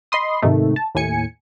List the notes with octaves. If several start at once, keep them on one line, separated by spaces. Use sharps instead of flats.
D#5 B5 C6 D#6
G#2 C3 D#3 A3
A5
D#2 A2 G#5 C#7